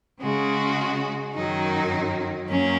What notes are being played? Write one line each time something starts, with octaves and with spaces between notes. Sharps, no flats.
C#3 G#3 F#4
F#2 D#3 F#3 D#4
F#2 F#3 A#3 C#4